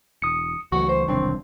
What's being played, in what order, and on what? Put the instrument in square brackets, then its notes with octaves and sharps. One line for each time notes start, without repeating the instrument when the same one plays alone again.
[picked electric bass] E1 [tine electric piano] D#6 C#7
[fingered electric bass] C#2 F#3 A3 [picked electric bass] E3 [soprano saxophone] F#4 [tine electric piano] C#6
[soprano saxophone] C5
[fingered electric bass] E1 C2 [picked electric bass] D#3 F#3 D4 [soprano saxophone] C4